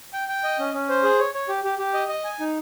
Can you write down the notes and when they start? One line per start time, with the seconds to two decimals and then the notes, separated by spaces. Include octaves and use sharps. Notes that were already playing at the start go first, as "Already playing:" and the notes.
0.13 G5
0.28 G5
0.44 D#5
0.59 C#4
0.74 C#4
0.89 C5
1.03 G#4
1.19 C#5
1.35 C#5
1.49 G4
1.64 G4
1.79 G4
1.94 D#5
2.09 D#5
2.24 G#5
2.40 D#4